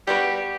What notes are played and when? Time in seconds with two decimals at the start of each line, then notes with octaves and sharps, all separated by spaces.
0.07 G3 B3 F#4 G4 B4
0.27 G4